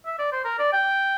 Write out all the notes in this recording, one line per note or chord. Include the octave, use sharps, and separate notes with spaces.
E5
D5
C5
A#4
D5
G5